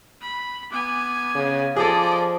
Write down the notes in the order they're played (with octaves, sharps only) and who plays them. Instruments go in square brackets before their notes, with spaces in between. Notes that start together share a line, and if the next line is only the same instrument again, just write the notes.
[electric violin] B5
[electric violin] B3 G#5 [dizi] D6
[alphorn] C#3
[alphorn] F3 [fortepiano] G#4 A4 [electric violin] D5 D#5 [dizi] D6